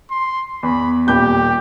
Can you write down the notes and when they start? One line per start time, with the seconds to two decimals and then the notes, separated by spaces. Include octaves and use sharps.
0.11 C6
0.63 E2 B5
1.08 D#1 G4 G6